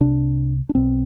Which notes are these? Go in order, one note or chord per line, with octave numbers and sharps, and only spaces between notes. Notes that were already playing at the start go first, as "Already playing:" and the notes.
C2 C3 D4
D4
B1 B2 C4